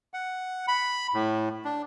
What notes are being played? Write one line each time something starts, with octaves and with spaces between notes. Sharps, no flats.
F#5
B5
A2
D4